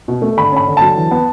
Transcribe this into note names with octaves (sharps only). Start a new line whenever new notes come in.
B2
A3
D3 B5
C#4 B5
D3
F#3 A5
E3
B3